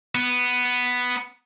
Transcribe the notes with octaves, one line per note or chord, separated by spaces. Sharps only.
B3